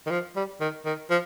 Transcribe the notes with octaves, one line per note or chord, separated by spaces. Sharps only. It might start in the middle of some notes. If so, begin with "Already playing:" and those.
D#3
F3
G3
D#3
D#3
F3